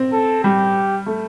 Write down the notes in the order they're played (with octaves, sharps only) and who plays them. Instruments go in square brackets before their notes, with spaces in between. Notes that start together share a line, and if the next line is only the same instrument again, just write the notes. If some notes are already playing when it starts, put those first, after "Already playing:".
Already playing: [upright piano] C4
[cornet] A4
[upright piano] G3 [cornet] G4
[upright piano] A3